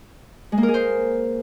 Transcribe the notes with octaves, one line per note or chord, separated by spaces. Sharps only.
G#3
A#3
A#4
G#4
C5